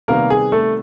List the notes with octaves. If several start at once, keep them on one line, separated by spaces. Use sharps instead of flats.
C3 D#3 G3 A#3 B3 A#4
G#4
A3 A4